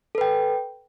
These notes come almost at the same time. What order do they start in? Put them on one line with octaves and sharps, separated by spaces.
A4 B4 G5